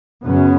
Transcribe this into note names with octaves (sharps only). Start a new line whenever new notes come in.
F#2 C#3 B3 C#4